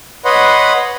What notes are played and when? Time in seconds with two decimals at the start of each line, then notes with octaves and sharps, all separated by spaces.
0.25 B4 C#5 D#5 F#5 B5 C6